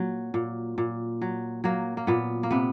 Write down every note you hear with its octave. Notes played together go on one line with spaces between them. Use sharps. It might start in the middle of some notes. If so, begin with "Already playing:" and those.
Already playing: A#2 F#3 A#3
A#2
A#2
F#3
F#3 A#3
A#3
A#2 B3
A#3
C3 B3